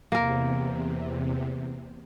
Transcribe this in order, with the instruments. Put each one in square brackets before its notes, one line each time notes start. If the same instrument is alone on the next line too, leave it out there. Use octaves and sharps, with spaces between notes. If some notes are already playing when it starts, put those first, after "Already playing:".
[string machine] E2 C3 [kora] A#3 A#4